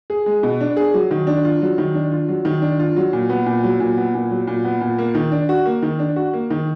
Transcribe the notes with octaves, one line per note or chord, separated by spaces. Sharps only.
G#4
G#3
B2
D4
G#4
F#3
D#3
D4
F4
F#3
D#3
D4
F4
F#3
D#3
D4
F4
F#3
A#2
B3
A#2
F#3
A#2
B3
A#2
F#3
A#2
B3
A#2
A#3
D#3
D4
F#4
A#3
D#3
D4
F#4
A#3
D#3